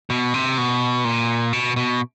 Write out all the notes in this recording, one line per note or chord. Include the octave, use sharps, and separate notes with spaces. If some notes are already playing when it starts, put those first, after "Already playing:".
B2
C3
B2
A#2
B2
B2